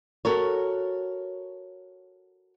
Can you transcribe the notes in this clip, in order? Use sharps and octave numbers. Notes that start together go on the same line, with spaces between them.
F#4 A4 A#4 C#5